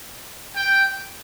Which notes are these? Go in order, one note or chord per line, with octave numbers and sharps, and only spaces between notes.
G5